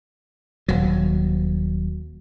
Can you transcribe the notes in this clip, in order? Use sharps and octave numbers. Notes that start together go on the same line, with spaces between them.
D#1 F#3